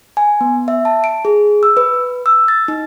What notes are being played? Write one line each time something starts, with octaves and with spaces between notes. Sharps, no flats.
G#5
B3
E5
A5
D7
G#4
E6
B4
E6
A6
D#4